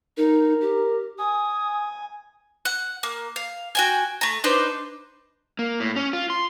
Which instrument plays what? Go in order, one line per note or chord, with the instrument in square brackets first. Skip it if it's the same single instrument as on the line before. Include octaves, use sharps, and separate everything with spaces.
[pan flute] D#4 [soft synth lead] A#4
[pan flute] G4
[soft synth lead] G#5 [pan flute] D#6
[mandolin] F#5
A#3
F5
F#4 G5 G#5
A3 A#5
D4 D#4 B4 C5
[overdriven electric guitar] A#3
A2
C#4
F4
C6